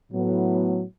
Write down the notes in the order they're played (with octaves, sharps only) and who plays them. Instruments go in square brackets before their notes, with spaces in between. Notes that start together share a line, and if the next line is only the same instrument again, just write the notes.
[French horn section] A2 F#3 B3